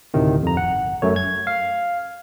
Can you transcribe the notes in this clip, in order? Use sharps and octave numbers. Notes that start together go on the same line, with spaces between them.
D2 A2 C3 D#3
F2 A#5
G1 F#5
F#2 A3 C#5
G#6
F5